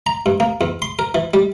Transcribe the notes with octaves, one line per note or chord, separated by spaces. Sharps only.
A#5
G2
A#3
E2
C6
A#4
E3
G3